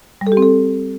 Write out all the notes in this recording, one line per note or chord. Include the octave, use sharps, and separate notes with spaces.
G3
A4
G4
C4
A4